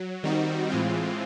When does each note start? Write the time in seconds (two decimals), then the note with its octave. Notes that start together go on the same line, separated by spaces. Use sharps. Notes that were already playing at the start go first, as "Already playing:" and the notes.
Already playing: F#3
0.23 D#3 G3 C4 D#4 F#4
0.70 A2 E3 G#3 C4 F4